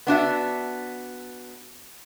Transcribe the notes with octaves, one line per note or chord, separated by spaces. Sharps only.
B3 D4 F#4 E5